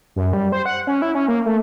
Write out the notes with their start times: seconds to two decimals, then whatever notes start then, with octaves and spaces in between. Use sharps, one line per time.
0.16 F#2
0.33 G3
0.52 C5
0.66 F#5
0.87 C#4
1.02 E4
1.15 C#4
1.28 A#3
1.46 A3